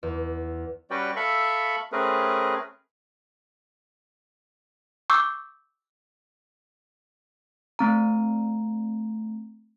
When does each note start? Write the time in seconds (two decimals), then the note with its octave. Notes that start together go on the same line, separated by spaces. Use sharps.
0.03 E2
0.91 G3 C#4 F#4 B4 D5 G5
1.16 A4 E5 F5 B5 C#6
1.92 A3 C4 C#4 G#4 A#4 B4
5.10 C#6 D6 E6 G6
7.79 A3 C4 A#5